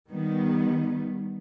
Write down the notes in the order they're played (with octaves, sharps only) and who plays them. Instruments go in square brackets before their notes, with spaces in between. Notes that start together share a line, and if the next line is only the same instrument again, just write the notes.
[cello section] D#3 G3 B3